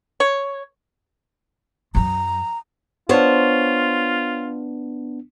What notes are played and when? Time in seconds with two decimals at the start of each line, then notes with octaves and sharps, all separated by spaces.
0.20 C#5
1.95 F#2 F#3 A#5
3.09 B3 D4 F4 C5 C#5